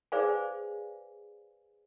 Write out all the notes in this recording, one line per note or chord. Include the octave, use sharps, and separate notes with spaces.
G#4 B4 C5 D5 F5 G#5